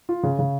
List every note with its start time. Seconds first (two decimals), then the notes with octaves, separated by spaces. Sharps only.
0.09 F4
0.23 C#3
0.39 C#3